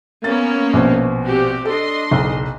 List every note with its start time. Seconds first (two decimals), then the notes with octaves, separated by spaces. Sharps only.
0.24 A#3 B3 C#4 A6
0.73 A#1 B2 C5
1.23 C4 F#4 G4
1.65 D4 A4 D#5 C6
2.11 F#1 B1